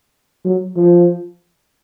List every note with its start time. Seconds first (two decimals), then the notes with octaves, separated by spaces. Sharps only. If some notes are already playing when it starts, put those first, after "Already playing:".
0.45 F#3
0.77 F3